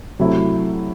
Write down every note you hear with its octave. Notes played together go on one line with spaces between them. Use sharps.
C3 F#3 A3 E4